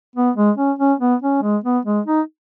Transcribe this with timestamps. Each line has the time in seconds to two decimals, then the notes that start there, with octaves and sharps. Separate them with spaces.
0.16 B3
0.36 G#3
0.57 C#4
0.79 C#4
1.00 B3
1.22 C#4
1.42 G#3
1.64 B3
1.86 G#3
2.06 D#4